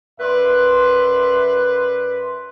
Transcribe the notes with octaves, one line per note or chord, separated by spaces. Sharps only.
F#2 B4 D5 E5 C6